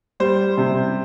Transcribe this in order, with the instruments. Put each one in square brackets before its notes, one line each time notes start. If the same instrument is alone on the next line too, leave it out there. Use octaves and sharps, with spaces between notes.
[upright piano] G3 [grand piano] C5
[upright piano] C3